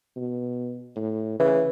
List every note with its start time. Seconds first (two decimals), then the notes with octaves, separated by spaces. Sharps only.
0.16 B2
0.96 A2
1.40 C#3 E3